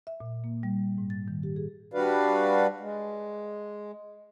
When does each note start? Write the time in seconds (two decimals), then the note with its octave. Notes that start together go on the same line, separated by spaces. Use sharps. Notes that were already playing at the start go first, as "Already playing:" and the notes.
0.07 E5
0.20 A#2
0.44 A#3
0.63 G3
0.98 G#2
1.10 A6
1.28 D#3
1.43 G4
1.56 G#4
1.94 G3 D4 F#4 B4 D5 F5
2.80 G#3